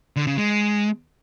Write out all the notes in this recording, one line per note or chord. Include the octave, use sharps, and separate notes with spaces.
D3
C#3
G#3